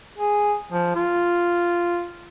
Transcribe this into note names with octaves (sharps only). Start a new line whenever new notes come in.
G#4
F3
F4